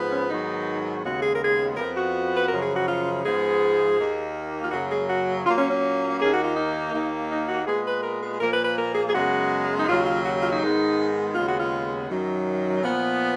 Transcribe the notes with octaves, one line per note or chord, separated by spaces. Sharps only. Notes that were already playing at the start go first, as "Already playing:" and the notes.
Already playing: G#2 F3 B3
C#4
G#2 D#3 F#3 B3 D#4
D#2 C#3 G#3 B3 F#4
G#4
A#4
G#4
F2 F3 B3 A#4
F#4
B4
F#2 C#3 F3 A#4
G#4
F#4
F4
G#2 F3 G#3 B3 G#4
D#2 D#3 A#3
F4
F#2 C#3 F#3 A#3 F#4
G#4
F#4
A#2 F#3 A#3 F4
C#4
C#4
D#2 D#3 A#3 G#4
F#4
F4
D#4
D#2 D#3 A#3
D#4
F#4
A#2 G#3 B3 G#4
B4
A#4
G#4
G#4
A#2 F3 A#3 A#4
B4
B4
A#4
G#4
G#4
F#2 C#3 G#3 B3 F#4
D#4
D#2 C#3 F#3 F4
F4
F#4
F4
D#4
G#2 D#3 G#3 B3
D#2 C#3 G#3 B3 F4
F#4
F4
F#2 D#3 F#3
A#2 F3 B3